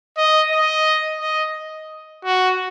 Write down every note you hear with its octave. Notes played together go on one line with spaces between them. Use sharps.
D#5
D#5
D#5
F#4